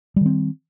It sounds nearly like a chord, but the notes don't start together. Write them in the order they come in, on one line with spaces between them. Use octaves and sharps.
G3 D#3 C4